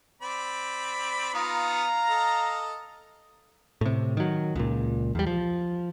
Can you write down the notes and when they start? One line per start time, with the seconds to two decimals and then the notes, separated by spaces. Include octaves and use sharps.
0.22 C4 D5 B5
1.34 B3 D#4 F4 F5 A#5
2.09 A4 D#5
3.81 A2 C3
4.17 D#3 F#3
4.55 C#2 A#2
5.15 E2 G3
5.27 F3